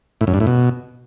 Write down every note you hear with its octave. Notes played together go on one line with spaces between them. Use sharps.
A2
F#2
G2
A2
B2